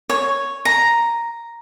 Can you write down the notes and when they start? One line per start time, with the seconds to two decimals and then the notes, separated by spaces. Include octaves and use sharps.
0.09 C#5
0.65 A#5